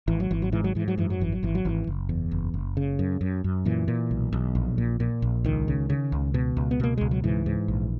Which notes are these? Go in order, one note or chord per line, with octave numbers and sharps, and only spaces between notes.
G#1 E3
F#3
G#1 E3
F#3
G#2 E3
F#3
G#2 E3
F#3
F#2 E3
F#3
G#1 E3
F#3
G#1 E3
F#3
G#1 E3
F#1
E2
F#1
F#1
C#3
F#2
F#2
F#2
A#2 E3
A#2
B1
B1
A#1
A#2
A#2
A#1
C#2 D#3
C#3
C#3
C#2
B2
C#2
B3
B2 A#3
C#2 G#3
F#3
G#2 E3
G#2
A#1